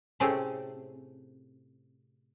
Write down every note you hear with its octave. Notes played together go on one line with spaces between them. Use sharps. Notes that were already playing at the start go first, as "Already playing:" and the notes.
A2 C3 A3 C4 C#4 G#4